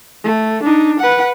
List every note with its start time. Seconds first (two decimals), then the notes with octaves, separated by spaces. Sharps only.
0.24 A3
0.63 D4 D#4
1.00 B4 F#5